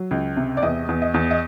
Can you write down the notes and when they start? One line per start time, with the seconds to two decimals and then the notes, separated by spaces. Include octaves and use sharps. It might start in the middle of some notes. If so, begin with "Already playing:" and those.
Already playing: F#3
0.11 C#2
0.36 C3
0.57 D5
0.62 E2 D#5
0.89 E2
1.02 D#5
1.14 E2
1.31 D#5